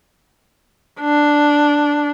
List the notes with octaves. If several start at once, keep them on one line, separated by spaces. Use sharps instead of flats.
D4